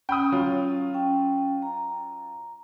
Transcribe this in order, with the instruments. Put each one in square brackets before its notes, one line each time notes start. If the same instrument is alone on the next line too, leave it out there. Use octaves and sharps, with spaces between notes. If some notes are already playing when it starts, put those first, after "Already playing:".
[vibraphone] C#4 [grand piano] G5 B5 D#6
[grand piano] F#3 F4
[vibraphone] C#4 G5
A#5